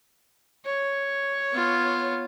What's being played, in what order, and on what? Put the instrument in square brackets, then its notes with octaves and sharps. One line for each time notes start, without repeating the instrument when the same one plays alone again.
[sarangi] C#5
[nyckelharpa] B3 F4